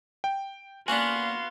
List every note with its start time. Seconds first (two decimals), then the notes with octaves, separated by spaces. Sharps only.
0.24 G5
0.88 A#3 B3 C#4 D4 F#4 F5 G#5 C6